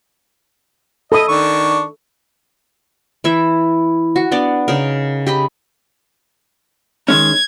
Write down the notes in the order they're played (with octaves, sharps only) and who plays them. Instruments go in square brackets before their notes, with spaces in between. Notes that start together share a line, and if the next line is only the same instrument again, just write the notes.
[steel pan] A4 B5 D#6 [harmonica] D#5
[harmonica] D#3 D4 C#6
[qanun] E3 E4 E5
F#4
B3 D4 D5
C#3 D#4 A#4
G4 D#5 B5
[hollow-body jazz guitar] D#3 G#3 C#4 [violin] G#6